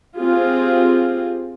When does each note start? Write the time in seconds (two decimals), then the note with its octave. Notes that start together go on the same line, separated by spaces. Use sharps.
0.17 C4 F4 G4 G#4